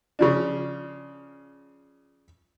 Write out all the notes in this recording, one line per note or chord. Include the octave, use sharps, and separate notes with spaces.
C#3 F3 D4